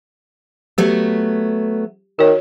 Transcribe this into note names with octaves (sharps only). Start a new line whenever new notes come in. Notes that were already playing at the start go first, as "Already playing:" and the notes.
F#3 A3 B3 G4
D#3 F#4 C#5